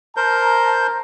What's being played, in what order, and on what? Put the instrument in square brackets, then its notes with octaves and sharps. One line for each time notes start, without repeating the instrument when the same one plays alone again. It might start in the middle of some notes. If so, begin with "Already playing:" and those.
[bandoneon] A#4 C5 G6 [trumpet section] A5 A#5